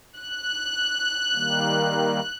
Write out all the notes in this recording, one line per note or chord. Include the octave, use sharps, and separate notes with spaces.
F#6
D#3 G3 A#3